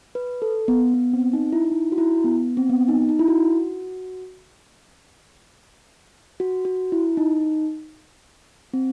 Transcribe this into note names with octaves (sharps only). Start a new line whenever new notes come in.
B4
A4
B3
B3
C4
D#4
E4
E4
D#4
F#4
E4
B3
C4
B3
D#4
D#4
E4
F#4
F#4
F#4
E4
D#4
C4